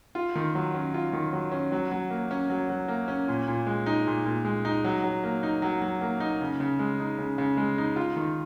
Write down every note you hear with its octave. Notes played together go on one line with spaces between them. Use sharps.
F4
D#3
F#3
C#4
F4
D#3
F#3
C#4
F#3
F#3
A#3
C#4
F#3
F#3
A#3
C#4
A#2
A#2
G#3
D#4
A#2
A#2
G#3
D#4
F#3
F#3
A#3
D#4
F#3
F#3
A#3
D#4
C#3
C#3
G#3
D#4
C#3
C#3
G#3
D#4
F4
D#3